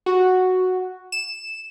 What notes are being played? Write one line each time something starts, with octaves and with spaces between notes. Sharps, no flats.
F#4
E7